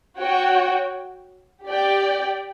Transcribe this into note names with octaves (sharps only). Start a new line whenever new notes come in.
F#4 C#5 G5
G4 D5 G5